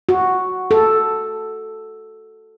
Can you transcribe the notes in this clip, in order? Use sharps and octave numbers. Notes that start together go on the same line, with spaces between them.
F#4
A4